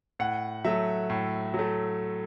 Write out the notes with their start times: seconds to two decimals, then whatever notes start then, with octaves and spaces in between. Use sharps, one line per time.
0.19 A2 F#5
0.64 F#3 A3 E5
1.10 A2
1.54 F#3
1.59 A3